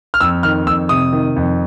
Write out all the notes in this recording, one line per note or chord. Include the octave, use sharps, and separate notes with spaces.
F6
F2 E6
D#3 F6
F2 E6
C3 D#6
D#3
F2